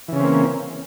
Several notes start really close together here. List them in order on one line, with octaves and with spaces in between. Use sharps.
E3 C#3 C#4 C4 A#3